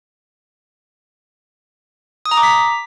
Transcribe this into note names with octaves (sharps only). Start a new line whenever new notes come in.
D#6
A#5
D6
B6